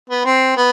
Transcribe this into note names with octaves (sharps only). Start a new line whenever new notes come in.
B3
C4
B3